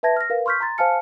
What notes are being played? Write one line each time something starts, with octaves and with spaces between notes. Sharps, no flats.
B4 E5 A5 G#6 A#6
F6 A#6
A#4 B4 F5
C6 C#6 F6 G6 B6
A#5 C6 A6
C5 F5 G#5 A5 F6 C#7